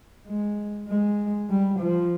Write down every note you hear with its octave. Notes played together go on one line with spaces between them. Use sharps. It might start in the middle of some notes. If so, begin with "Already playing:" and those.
G#3
G#3
G3
F3